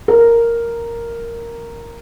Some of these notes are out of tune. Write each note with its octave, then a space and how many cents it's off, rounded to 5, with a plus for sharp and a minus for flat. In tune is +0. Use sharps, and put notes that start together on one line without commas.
A#4 -5